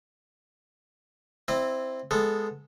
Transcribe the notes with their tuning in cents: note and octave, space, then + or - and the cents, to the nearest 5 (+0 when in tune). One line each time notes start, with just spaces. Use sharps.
C4 +0 E4 +0 D#5 -40
G#3 +0 B3 +0 A4 +0